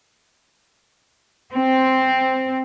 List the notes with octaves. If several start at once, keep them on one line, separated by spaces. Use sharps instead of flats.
C4